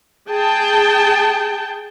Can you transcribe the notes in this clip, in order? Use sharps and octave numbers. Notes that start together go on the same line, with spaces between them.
G#4 G5 A5